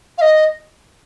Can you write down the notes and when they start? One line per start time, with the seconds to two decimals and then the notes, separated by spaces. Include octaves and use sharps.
0.18 F5
0.21 D#5